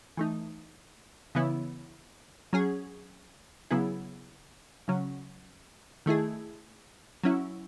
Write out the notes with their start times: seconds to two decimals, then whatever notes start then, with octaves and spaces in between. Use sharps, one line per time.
0.17 E3 A3 D#4
1.35 C#3 E3 B3 E4
2.53 F#3 C#4 G#4
3.71 C#3 F#3 B3 E4 G#4
4.88 C#3 F#3 C#4
6.06 D#3 A3 E4 G#4
7.23 F#3 C#4 E4